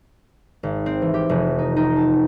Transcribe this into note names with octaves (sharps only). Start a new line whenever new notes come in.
G#1
C4
E3
G4
F1
D#4
D#4
A5